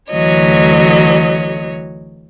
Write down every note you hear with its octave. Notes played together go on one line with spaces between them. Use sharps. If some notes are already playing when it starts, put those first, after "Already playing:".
D2 E3 F#3 C#5 D#5